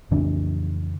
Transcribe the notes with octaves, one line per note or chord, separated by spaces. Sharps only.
F2 C#3 E3 D4